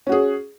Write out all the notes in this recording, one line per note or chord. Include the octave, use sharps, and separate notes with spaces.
C#4 F#4 G#4